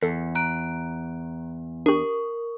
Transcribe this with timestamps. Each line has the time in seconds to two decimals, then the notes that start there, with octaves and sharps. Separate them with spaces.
0.03 E2 A4
0.35 A#5 F#6 D7
1.86 D4 G4 A#4 C#6